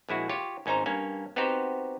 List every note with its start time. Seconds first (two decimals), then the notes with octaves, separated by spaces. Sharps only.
0.09 A#1 G#3 E4 F#4
0.29 F4 G4 C#5
0.66 G#1 C#4 D#4 C5 A#5
0.86 G2 A#3 C#4
1.36 B3 C4 D#4 F#4 G4 C5